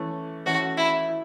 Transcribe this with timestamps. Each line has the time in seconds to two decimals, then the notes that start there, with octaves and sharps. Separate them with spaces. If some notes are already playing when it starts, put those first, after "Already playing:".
Already playing: E3 A3 C#4
0.46 E3 A3 C#4 F#4
0.77 E4
1.09 E4